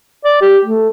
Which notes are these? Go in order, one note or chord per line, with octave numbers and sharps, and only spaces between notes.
D5
G4
A3